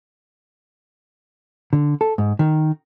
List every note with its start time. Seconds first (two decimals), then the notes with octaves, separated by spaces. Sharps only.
1.73 D3
2.01 A4
2.18 G#2
2.39 D#3